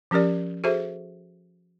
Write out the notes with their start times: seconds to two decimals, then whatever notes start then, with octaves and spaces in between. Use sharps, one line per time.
0.11 F3 C#4 G4 A#4 D5
0.64 F#4 G#4 A4 C5 E5